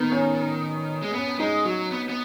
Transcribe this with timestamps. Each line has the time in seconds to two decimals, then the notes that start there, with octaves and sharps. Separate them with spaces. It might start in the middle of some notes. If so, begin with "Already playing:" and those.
Already playing: D#3 B3
0.12 C#4
1.02 G#3
1.13 B3 C#4
1.39 G#3 D#4
1.65 F#3 F#4
1.91 B3
2.09 B3